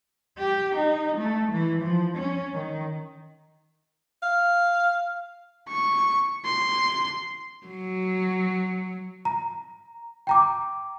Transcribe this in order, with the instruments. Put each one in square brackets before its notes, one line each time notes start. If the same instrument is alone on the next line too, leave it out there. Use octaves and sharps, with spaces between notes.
[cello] G4
D#4
A3
E3
F3
C#4
D#3
[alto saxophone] F5
[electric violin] C#6
C6
[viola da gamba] F#3
[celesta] A#5
G5 A#5 D6